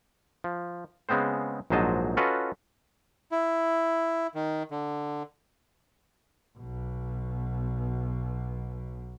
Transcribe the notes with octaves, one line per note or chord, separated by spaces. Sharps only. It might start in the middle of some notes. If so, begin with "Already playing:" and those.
F3
C#3 G#3 B3 C4 C5
A#1 G#2 F#3 C5 D#5 A5
C#4 F4 F#4 A4 B4 D#5
E4
D#3
D3
B1 B2